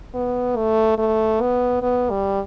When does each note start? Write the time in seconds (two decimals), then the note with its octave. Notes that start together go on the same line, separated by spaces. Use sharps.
0.15 B3
0.56 A3
0.98 A3
1.41 B3
1.82 B3
2.10 G3